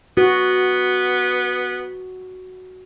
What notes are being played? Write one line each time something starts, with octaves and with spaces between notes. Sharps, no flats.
B3 F#4